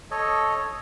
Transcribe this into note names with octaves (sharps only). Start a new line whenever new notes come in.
A4 C#5 D#5